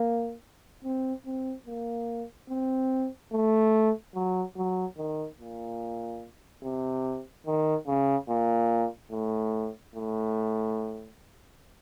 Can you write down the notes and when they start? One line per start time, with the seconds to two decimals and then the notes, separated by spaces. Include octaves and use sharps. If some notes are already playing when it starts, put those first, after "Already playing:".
Already playing: A#3
0.84 C4
1.26 C4
1.67 A#3
2.50 C4
3.33 A3
4.15 F#3
4.57 F#3
4.97 D#3
5.40 A#2
6.63 C3
7.46 D#3
7.87 C#3
8.29 A#2
9.11 A2
9.95 A2